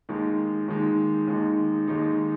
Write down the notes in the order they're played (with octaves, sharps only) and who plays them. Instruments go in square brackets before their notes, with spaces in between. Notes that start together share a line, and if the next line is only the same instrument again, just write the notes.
[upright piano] D#2 D#3 G#3 D#4
D#2 D#3 G#3 D#4
D#2 D#3 G#3 D#4
D#2 D#3 G#3 D#4